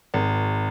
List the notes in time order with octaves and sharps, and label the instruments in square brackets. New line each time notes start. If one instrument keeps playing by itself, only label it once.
[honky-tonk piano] G#1